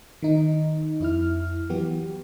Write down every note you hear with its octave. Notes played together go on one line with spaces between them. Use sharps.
D#3 D#4
F2 E4 F6
E3 F#3 B3 F#4 G4